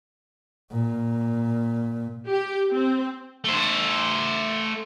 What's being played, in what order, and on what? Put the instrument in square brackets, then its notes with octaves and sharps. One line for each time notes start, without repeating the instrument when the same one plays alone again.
[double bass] A#2
[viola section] G4
C4
[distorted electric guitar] A3 C5